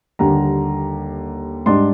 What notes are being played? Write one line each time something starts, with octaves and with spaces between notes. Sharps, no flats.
D#2 D3 G3 A#5
G#2 G3 D4 C6